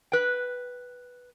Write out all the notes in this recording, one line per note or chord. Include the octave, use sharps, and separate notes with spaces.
B4 G5